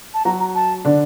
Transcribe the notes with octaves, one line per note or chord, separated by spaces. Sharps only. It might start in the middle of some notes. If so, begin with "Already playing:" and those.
A5
F#3 F#4 A#5
A#5
A5
D3 D4